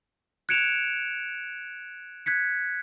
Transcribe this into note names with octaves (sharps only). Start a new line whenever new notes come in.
F#6 G#6 C#7 D7 E7 F7
F#6 G#6 B6 C#7